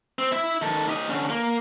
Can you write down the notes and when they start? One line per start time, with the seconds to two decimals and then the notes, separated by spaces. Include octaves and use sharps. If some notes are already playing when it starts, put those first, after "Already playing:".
0.19 C4
0.32 E4 E5
0.62 D#3 A4
0.89 G4 D#5
1.10 D3 C#4
1.30 A#3